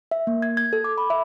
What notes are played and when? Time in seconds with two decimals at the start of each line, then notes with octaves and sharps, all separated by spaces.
0.11 E5
0.27 A#3
0.42 G#6
0.57 G#6
0.73 A4
0.84 D6
0.98 B5
1.10 E5